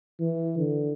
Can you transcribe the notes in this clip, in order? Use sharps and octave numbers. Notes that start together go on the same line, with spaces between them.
E3
D3